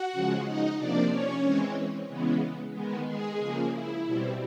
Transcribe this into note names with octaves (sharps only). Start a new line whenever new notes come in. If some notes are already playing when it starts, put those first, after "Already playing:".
Already playing: F#4 F#5
C#3 F3 G#3
D#4 D#5
C3 F3 A#3 D4 D5
C#4 C#5
E3 G#3 C4
C#3 E3 G#3 B3
D#3 G#3 B3
G#3 G#4
C#3 F3 A#3
E4
B2 G3 C4